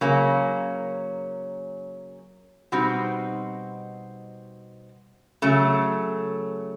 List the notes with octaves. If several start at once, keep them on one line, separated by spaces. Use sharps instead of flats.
C#3 F#3 A#3 C#4
B2 G3 C4 D#4 F#4
C#3 F#3 A3